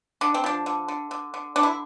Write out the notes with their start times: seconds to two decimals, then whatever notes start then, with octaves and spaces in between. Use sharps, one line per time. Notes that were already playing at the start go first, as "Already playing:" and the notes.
0.21 D3 D4
0.34 C4
0.44 F3 D4
0.66 D3
0.88 D3
1.11 D3
1.34 D3
1.56 D3 D4
1.63 E4